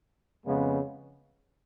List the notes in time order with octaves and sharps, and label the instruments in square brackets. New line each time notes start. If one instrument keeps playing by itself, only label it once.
[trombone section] F2 C#3 G#3 B3